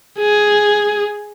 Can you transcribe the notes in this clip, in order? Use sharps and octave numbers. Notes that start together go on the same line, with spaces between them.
G#4